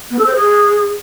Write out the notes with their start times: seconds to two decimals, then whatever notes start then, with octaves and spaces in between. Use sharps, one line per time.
0.11 B3
0.19 A4
0.26 C5
0.34 G#4